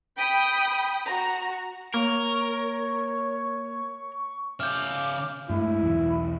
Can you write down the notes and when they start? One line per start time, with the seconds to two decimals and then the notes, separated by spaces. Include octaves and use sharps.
0.17 G5 B5 D#6 G6 B6
1.07 F#4 A#5
1.94 A#3 A#4 C#5 C#6
4.60 C#3 E5 D6 F6 G6
5.49 G2 G#3 A3 E4
5.82 B1 E2